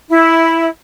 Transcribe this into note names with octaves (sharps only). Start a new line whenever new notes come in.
E4